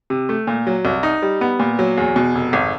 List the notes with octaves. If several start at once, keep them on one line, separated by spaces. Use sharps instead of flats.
C3
A3
A#2
F#3
C2
D#4
G3
B3
A#2
F#3
E2
B2
F1
G#1